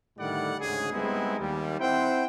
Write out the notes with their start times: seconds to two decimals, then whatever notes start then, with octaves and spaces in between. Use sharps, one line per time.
0.18 A2 D3 D#3 G3 D5 F#5
0.61 D2 G#2 C#3 G#4
0.92 G3 G#3 B3 C4 D#4 E4
1.39 D#2 G3
1.80 C4 E4 C5 F#5 G5